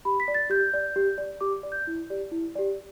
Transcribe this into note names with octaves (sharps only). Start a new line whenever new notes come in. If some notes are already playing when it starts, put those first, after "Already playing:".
G4 B5
B6
D5
A6
G4 G6
D5
G4
D5
G4 D6
D5
G6
E4
G4 D5
E4
G4 D5